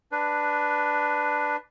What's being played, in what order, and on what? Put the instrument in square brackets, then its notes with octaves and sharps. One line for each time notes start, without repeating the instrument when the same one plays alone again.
[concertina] D4 B4